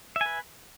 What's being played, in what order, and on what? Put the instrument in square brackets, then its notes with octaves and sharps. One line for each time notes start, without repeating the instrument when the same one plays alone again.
[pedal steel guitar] E5
G#5
B4